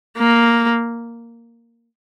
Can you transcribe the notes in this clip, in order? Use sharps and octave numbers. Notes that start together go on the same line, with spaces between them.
A#3